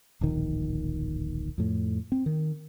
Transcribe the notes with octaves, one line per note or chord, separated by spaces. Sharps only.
D1 A#1 D#3
F2 A2
C4
D#3